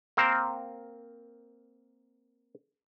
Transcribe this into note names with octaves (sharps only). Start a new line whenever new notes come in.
A#3 C4 A#4 C5